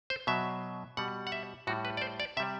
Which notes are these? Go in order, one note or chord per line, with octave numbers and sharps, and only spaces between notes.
C5
B2 F#3 E5
B2 G3 F#5
F#5
E5
A2 G3 F#4
B4
D5
C5
D5
C3 G3 E5